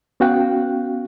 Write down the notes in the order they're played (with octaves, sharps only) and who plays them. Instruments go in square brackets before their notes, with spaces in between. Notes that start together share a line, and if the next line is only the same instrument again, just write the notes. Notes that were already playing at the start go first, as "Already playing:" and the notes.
[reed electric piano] B3 C#4 F#4 F5 G5 F#6